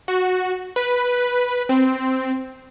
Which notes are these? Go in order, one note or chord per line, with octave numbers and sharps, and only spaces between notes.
F#4
B4
C4